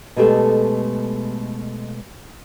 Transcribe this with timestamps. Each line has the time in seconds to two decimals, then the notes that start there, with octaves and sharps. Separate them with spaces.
0.16 B2 G#3 A3 G4 A4